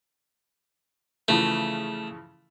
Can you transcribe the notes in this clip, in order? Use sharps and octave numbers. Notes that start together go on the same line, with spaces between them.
C#3 E3 F3 A3